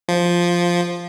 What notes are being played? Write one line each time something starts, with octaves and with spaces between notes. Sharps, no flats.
F3